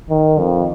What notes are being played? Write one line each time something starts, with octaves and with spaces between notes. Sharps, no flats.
D#3
F2